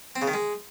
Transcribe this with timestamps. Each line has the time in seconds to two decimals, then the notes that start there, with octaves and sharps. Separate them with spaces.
0.16 C4
0.22 C#3
0.28 D#3
0.34 G#3